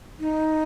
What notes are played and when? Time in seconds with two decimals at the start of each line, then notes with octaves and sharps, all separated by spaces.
0.20 D#4